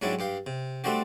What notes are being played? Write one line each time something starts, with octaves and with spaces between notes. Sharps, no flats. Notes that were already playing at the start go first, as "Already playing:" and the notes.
G#2 F#3 G3 C#4 D4 E4
G2 G4 F5
C3
G3 A3 C4 D4 F#4 G4